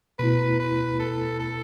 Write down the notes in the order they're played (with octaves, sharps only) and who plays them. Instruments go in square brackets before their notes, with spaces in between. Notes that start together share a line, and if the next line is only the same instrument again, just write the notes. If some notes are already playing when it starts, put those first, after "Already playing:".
[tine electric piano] B2 A3 E4 [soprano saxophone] B4
[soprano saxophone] B4
A4
A4